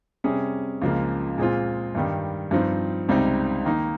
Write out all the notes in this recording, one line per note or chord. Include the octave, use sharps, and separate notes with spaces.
C3 G3 C#4 G#4
C#2 C#3 F3 A#3
A#2 G#3 C4 F4
G2 D#3 G3
G2 F3 C4 D#4
C#2 C3 G3 C4 D#4
D#3 A#3 D#4